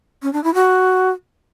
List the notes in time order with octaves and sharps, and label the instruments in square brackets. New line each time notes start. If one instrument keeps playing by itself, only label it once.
[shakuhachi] C#4
D4
E4
F#4